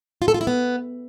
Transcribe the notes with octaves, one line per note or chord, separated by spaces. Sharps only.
F4
A4
F4
E4
B3